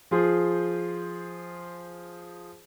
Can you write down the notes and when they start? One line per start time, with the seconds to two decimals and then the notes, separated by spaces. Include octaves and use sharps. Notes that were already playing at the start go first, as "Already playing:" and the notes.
0.11 F3 F4 G#4 C5